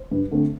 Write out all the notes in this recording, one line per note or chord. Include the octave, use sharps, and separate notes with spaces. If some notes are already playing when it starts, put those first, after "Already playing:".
Already playing: C5
G2
D3 A3 C4